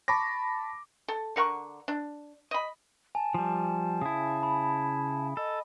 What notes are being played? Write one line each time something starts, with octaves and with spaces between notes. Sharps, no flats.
A5 B5 C#6 D6 A#6
A4
D3 A#4 F#5 C#6
D4
D#5 B5
G#5 A5
F3 G3
C#3 E4 D#6
B5
A4 D#5